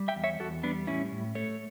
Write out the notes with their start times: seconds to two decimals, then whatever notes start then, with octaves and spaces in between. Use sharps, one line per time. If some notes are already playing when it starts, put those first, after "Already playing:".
Already playing: G3
0.08 E5 G5
0.16 E2
0.24 C#5 E5
0.40 E2 F#4 A4
0.63 G3 B3 D4
0.87 A2 C#4 E4
1.12 A2
1.35 A3 A4 C#5